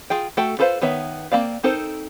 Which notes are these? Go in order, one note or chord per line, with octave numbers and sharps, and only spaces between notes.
F4 G#4 G5
A3 F#4 A4 G5
F4 A4 B4 C5 F5
D#3 B3 C#5 E5
A#3 C4 D5 F5
C4 D#4 A4 A#4 C5